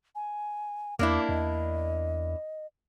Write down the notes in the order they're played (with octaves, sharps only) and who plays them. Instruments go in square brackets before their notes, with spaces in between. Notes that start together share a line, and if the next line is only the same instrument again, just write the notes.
[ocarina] G#5
[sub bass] E2 [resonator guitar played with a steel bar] A#3 D4 E4 [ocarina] D6
[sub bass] E2 [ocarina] D#5